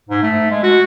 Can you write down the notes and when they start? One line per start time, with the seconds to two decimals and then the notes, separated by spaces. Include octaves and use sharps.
0.09 G#2
0.22 A3
0.50 G#3
0.63 F#4